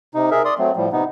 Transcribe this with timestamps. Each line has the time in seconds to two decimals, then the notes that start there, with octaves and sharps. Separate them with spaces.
0.15 C3 D#4
0.31 G#4 A#4 E5
0.45 D5 C6 D#6
0.59 F#3 A3 C4
0.77 A2 F3 G3
0.92 C3 B3 D#4